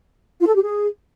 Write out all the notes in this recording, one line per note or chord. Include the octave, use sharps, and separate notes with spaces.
F4
A4
G4
G#4